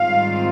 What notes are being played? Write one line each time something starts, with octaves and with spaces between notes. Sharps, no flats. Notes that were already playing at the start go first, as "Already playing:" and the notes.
Already playing: G#2 D#3 G3 C4 F4 F5